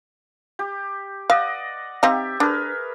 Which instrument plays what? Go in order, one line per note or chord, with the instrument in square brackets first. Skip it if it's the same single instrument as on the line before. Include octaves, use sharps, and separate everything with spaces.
[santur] G4
[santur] D5 D#5 F#5 [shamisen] F5
[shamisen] C4 D#4 F5 [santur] G4 E5
[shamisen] D4 [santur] G#4 A#4 B4